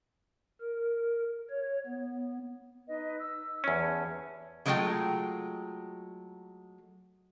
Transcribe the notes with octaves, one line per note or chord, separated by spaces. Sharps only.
A#4
C#5
B3
D#4 B4 D#5
E6
E2 C#4
B4 A5
D3 F#3 G#3 A3 F4 G5